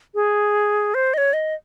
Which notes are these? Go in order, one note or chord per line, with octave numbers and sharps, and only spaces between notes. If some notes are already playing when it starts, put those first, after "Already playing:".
G#4
C5
D#5
C#5
D#5